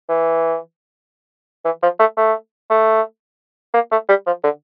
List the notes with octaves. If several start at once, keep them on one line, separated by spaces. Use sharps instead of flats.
E3
E3
F3
A3
A3
A3
A#3
A3
G3
F3
D3